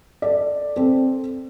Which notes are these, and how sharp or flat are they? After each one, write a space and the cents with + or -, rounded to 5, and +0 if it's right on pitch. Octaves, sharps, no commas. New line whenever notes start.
A4 +0 D5 +5
C4 +10 A4 +0